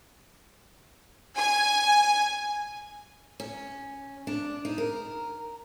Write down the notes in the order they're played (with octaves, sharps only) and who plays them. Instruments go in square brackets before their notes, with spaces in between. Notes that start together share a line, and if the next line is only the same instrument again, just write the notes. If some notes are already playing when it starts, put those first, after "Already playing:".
[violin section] G#5
[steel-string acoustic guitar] C#4
D4
D#4
A#4